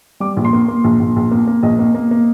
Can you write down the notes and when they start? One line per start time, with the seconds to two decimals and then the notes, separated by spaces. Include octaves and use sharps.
0.20 G3 D6
0.37 A#1
0.45 C6
0.53 A#3
0.68 A#3
0.84 A#1
0.99 A#1
1.16 A#1
1.31 A#3
1.47 A#3
1.63 A#1 D#5
1.79 A#3
1.95 A#3
2.11 A#3